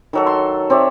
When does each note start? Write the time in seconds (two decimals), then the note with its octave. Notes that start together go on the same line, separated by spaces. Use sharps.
0.13 D#3 F#3 A4
0.27 C6
0.70 C4 C#5 D5 E5